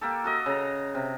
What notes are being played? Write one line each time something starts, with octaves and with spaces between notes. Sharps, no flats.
A#3 G4 A4
F#4 A4 D#5
C#3 A#5
C3